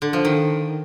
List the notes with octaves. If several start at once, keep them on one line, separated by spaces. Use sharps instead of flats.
D3
F3
D#3